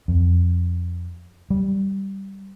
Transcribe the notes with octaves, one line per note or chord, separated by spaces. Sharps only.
F2
G3